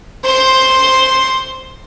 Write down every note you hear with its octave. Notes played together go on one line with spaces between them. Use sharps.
C5 C6